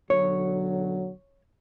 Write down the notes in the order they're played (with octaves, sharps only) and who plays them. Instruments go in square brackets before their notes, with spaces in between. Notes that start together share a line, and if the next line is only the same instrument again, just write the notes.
[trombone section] B1 D3 F#3 [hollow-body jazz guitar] C#5